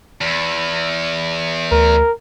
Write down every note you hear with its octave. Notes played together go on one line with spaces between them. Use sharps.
E2
D2 A#4